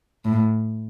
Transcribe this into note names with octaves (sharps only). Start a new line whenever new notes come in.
A2